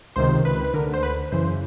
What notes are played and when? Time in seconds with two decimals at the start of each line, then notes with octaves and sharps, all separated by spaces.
0.16 C#2 C3 D#3 C5
0.45 B4
0.64 B4
0.74 D2 D3 A#4
0.94 C5
1.03 B4
1.32 F#2 C#3 E3 C5